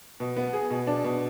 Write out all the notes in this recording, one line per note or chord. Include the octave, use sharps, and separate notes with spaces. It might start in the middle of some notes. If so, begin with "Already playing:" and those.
B2
B3
G#4
B2
D4
B2